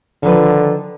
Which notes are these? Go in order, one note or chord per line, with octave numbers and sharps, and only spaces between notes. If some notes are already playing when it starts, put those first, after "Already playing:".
D3 D#3 F3 B4